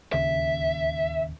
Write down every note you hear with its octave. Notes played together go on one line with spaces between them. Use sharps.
D1 D#2 C#3 E5